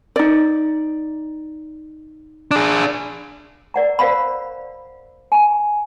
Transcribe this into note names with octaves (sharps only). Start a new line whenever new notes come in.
D#4 D5
D4 G#4
A#4 D5 F#5 A#5
A#4 C5 D5 F5 F#5 B5
G#5 A#5